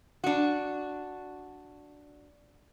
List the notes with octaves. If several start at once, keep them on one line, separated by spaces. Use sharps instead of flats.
D4 F#4